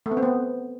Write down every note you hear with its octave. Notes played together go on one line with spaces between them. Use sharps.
A3
B3
C4
B3